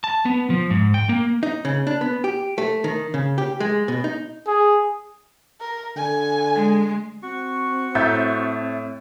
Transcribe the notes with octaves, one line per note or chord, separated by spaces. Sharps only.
A5
B3
F3
G#2
G5
A#3
D#4
C#3
D4
B3
G4
A3
D#3
C#3
G4
G#3
B2
D#4
G#4
A#4
D3 G#5
G#3
C4 F#4 C#6
A2 E5 G6 A6